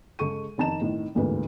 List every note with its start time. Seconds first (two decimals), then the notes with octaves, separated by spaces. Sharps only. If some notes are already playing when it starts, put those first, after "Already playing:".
0.19 C#3 G#3 A4 C#6 D#7
0.58 F1 D#3 A5 A#5 E7
0.81 A2 D#3
1.15 A1 D2 G#2 A#3 B4